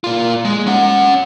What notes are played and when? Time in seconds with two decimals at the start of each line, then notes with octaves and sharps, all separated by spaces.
0.04 A#3 F4
0.45 G#3
0.67 C#4 F#5